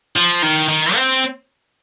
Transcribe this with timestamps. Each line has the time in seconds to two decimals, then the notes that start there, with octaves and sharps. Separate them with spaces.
0.16 F3
0.42 D#3
0.68 D#3
0.95 C4